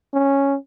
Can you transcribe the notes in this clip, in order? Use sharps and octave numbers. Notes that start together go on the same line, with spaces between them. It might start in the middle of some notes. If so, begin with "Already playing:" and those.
C#4